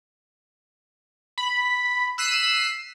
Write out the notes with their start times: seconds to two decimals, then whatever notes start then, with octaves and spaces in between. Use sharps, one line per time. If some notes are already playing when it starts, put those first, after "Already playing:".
1.38 B5
2.18 E6 F#6 B6 C7 D#7 E7